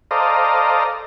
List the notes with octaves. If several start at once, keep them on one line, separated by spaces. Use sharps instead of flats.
A4 C5 D5 D#5 F5 A#5